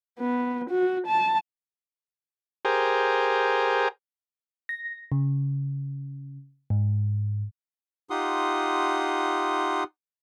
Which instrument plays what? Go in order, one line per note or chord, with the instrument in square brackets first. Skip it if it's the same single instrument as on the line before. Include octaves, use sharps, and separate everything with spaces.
[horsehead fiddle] B3
F#4
A5
[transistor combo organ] G4 G#4 A#4 C5
[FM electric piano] A#6
C#3
G#2
[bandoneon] D#4 F4 G4 F#5 C6 D#6